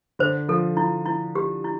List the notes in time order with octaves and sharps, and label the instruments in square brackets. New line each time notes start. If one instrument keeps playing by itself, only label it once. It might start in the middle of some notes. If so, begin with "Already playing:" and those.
[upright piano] D3 [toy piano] C5
[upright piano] F3 [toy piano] A4
[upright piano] F3 [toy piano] E4
[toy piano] E4
G4
E4